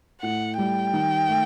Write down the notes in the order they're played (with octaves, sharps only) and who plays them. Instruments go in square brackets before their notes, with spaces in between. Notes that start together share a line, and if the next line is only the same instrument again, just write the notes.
[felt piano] A2 [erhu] F#5
[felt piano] G3 [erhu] G5
[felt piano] D#3
A3